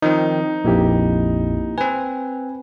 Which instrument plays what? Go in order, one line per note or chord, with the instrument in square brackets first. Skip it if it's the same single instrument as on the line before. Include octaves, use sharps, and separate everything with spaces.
[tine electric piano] D#3 F3 C4 [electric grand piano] D#4
[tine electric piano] A#1 F2 [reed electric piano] A#3 E4 G4
[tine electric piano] C4 B4 [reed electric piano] G#5